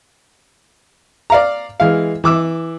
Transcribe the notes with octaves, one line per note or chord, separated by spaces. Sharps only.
D5 F5 A#5
E3 G#3 F5
E3 D6 E6